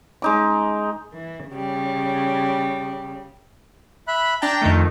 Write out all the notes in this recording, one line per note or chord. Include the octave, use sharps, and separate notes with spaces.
G#3 D#4 D6
E3
C#3 G3
E5 B5 F#6
D4 G5 A5 A#5
F2 D#3 A3